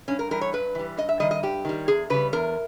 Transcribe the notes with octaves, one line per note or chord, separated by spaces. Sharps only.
G2 C#4
A#4
E3 G3 A#4
C#5
G2 B4
E3 G3
G2 D#5
E5
D#3 G3 D#5
D#5
G2 G4
D#3 G3
E2 G#4
C#3 G3 B4
E2 A#4